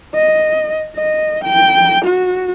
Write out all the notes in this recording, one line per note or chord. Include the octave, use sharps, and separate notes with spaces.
D#5
D#5
G5
F#4